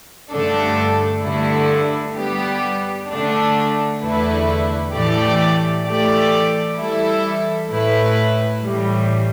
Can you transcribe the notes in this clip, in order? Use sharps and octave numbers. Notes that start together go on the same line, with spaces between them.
G2 D3 A3 D4 A4
G2 D3 A3 E4
G3 B3 G4
D3 A3 D4
E2 D3 A3 E4 B4
A2 E3 A3 G4 D5
E3 A3 G4 D5
E3 G3 E4 A4
A2 A3 E4 B4
A2 E3 G3